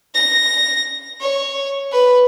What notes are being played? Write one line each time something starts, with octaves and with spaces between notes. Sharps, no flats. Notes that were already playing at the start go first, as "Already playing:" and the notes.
A#6
C#5
B4